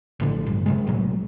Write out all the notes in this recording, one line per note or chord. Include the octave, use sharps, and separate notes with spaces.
A#1 A2 D3
A1 G2
C3 D#3 G#3
B1 A2 F#3